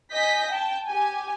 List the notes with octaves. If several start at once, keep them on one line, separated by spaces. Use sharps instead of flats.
D#5 G#5 G6 A#6 B6
G5 A5
G4 G#5